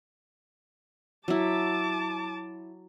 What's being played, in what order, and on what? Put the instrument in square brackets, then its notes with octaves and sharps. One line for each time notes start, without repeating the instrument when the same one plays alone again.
[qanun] F#3 E4 [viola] A5 D6